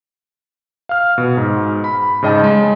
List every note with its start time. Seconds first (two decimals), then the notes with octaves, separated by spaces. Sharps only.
0.89 F5 F6
1.18 B2
1.37 G#2
1.84 B5
2.22 G#2 C#3 D#5 G5 A5
2.44 G#3